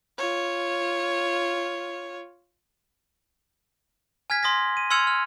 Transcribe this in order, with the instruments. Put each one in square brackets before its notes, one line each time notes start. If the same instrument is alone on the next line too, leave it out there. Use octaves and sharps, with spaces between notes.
[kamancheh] F4 C#5
[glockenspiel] G#5 F6 G#6 B6
C6 D#6 A#6 B6
D#7
C6 E6 F6 G#6 C#7 F7
F6